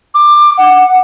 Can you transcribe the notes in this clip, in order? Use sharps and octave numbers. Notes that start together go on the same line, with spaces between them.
D6
F#5